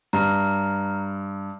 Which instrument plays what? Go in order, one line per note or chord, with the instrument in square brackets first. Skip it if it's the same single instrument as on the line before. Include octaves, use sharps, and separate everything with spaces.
[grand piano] G2 [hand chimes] A#5 F6